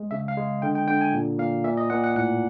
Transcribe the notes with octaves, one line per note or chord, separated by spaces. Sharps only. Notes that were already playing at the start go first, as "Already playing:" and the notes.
Already playing: G#3
C#3 E5
F5
G#3
D3 G5
G5
D3 G5
G#5
A#2
A#2 F5
A#2 E5
D#5
A#2 F#5
F#5
A2 F#5